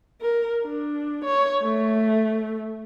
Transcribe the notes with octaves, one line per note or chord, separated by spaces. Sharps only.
A#4
D4
C#5
A3